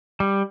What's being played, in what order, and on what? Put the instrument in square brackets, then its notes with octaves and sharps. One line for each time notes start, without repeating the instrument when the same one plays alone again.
[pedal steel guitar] G3